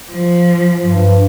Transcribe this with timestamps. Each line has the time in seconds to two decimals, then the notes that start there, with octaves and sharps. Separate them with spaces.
0.11 F3
0.84 G2